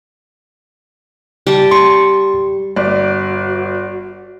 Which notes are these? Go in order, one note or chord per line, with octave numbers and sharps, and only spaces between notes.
G3 A5
C6 C#6
G1 F#4 D5